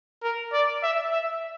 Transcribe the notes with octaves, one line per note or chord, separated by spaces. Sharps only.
A#4
D5
E5
E5